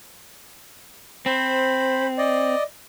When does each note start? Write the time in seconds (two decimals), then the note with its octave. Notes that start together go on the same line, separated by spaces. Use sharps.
1.26 C4 C5 B5
2.18 D5 D#5